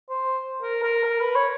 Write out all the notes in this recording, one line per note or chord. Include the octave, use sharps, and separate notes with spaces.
C5
A#4
A#4
A#4
B4
C#5